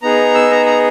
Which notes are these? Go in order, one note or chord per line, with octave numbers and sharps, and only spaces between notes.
B3 D#4 G#4 A#5
E6
A#5
A#5